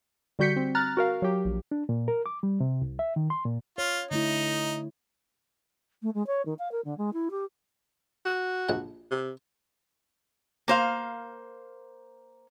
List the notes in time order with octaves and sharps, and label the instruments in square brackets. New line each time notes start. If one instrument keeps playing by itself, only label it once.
[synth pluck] D3 G3 F#4 G6 B6 C#7
C4
A#5 F6 F#6 A6
F#4 A#4 F5
F#3 G4
A#1
[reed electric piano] D4
A#2
A#4
D6
G3
C3
C2
E5
D#3
C6
A#2
[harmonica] F4 [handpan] C#5
[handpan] D3 A3 E4 [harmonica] D#4
[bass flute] A3
G#3
C#5
D#3
F5
A#4
D3
G#3
E4
G4
[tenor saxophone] F#4
[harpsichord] A#1 F#5
[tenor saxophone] C3
[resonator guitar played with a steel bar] A#3 C5 F5